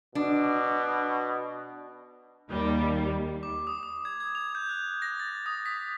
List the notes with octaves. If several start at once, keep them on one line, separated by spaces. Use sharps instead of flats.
B2 D4
D#2 G3
D6
D#6
D#6
G#6
G#6
F7
G6
F#6
A#6
A6
D#6
B6